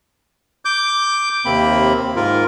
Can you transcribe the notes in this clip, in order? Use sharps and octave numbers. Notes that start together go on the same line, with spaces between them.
D6 G6
D#2 C3 A#3 C4 B5
G#2 F4 A#4